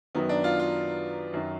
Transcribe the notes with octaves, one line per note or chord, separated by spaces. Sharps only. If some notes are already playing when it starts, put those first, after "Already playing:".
F#2 D#3 F#3 B3
D4
F4
F4
F#2 D#3 F#3